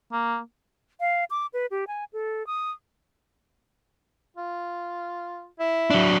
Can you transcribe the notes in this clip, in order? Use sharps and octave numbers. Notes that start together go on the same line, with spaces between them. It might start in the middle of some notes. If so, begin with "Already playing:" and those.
A#3
F5
D6
B4
G4
G#5
A4
D#6
F4
E4
F#3 D4